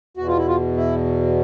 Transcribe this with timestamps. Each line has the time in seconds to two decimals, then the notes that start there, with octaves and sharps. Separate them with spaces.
0.17 E2 B2 F#4
0.27 F4
0.37 E4
0.48 F4
0.77 E4